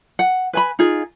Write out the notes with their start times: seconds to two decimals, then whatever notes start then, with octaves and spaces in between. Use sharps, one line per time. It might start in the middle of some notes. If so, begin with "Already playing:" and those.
0.19 F#5
0.53 B4 G#5 B5
0.79 D#4 F4 G#4